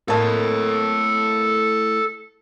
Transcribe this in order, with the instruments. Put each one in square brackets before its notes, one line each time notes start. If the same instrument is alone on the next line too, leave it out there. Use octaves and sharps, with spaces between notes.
[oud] A2 [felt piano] A#3 A5 [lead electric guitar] A4 D#5